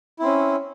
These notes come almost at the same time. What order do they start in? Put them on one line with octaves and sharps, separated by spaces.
E4 C4 C#4